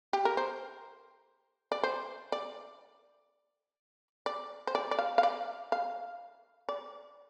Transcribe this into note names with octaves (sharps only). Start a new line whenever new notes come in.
G4
A#4
C5
D5
C5
D5
D5
C5
D5
D5
F5
F5
D5
F5
D5